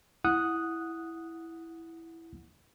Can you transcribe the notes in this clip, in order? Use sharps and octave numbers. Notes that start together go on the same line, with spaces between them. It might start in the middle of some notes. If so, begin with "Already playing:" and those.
E4 F#5 D#6 F#6